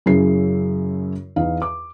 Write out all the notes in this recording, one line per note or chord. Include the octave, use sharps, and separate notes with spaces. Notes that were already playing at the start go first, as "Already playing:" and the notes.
F#2 C#3 E4 G#4 C7
E2 D#4 F5
D6